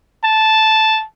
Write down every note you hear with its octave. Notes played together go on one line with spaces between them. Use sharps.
A5